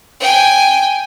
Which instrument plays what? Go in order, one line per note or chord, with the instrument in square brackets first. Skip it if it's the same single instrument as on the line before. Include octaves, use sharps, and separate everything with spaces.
[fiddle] G5 G#5